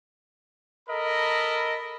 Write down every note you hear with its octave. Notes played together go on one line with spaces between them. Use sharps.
A4 A#4 D#5 B5